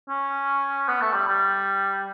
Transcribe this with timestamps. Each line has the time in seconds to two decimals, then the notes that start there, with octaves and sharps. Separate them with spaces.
0.09 C#4
0.88 B3
1.01 A3
1.13 G3
1.27 G3